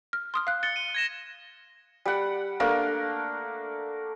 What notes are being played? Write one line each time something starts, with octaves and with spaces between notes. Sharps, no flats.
F6
C6 D#6 F6
F5 F#6
A6 C#7 G7
D#7 G7
G#6 A#6 E7
G3 F#5
A3 A#3 D4 A#4